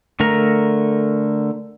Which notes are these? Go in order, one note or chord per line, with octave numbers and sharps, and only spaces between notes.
D3 A3 A#4 A#5